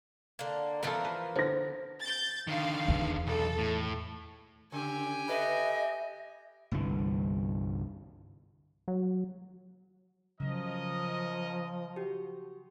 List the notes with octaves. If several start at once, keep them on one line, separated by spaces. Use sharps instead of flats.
D3 A#3
E3 F3 B3 F4 A4 A#4
B4 C5
D3 C5 A#6
G6 A6
D3 D#3 F5
E2
B1 A4
A2
C#3 G4 G#5
A4 B4 D#5 E5
G1 C2 G2 E3
F#3
C#3 F3 F#3 C#4 A#4 D#5
F#4 G4